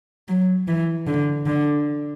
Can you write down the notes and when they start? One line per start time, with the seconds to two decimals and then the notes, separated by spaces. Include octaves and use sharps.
0.29 F#3
0.68 E3
1.07 D3
1.47 D3